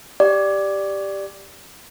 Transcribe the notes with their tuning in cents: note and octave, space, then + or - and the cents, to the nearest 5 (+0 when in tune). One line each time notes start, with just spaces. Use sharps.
G4 +0 D5 +0